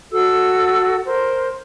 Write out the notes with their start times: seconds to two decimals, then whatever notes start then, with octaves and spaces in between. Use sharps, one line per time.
0.12 F#4 A4 E6
1.06 A#4 C5